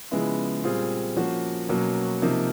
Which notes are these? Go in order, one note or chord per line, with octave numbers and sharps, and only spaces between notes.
C#3 F3 G#3 B3 E4
A#2 G3 C4 F4 G#4
F3 A#3 C#4 F#4
B2 F#3 A#3 C#4 F#4
C3 F3 A#3 D#4